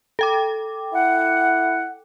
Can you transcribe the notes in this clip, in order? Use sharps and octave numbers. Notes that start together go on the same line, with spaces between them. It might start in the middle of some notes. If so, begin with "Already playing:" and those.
A4 G5 D6
E4 F#5